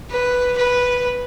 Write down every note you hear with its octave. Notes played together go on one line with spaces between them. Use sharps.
B4
B4